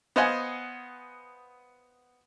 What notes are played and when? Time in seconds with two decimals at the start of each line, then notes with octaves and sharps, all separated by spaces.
0.16 B3 C5 D#5 F5 F#5 G#5